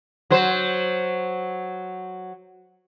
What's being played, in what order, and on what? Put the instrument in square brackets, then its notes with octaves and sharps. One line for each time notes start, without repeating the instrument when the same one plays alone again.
[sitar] F#3 C5